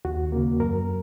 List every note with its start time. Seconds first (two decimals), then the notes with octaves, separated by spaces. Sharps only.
0.05 D#2 F#4
0.32 C#3 A#3
0.60 F#2 A#4